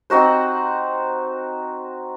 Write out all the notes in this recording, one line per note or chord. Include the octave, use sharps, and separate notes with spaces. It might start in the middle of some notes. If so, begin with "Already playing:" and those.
C4 D#4 F#4 C5